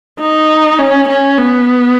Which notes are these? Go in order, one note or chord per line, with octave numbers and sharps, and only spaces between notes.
D#4
C#4
C#4
B3